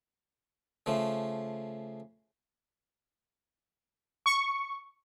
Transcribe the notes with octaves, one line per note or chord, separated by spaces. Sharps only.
C#3 F3 A3
C#6